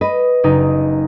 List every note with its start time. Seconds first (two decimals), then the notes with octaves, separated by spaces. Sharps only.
0.01 B4 D#5
0.44 F#1 D#4